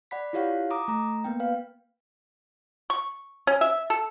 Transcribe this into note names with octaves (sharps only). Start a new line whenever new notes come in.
D5 F#5 B5 B6
E4 F4 G4 C#5 F5 F#5
A#5 D6 D#6
A3 A#5
A#3 B3 G5
B4 F5
C#6
C#4
E5
A4